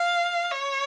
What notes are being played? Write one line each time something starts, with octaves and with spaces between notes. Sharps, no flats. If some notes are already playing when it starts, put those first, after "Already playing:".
Already playing: F5
C#5